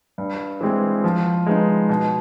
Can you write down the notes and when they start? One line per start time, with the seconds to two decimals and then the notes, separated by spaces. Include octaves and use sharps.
0.18 G2
0.61 E3 G#3 C4
1.04 F3
1.46 G#3 B3 D#4
1.89 B2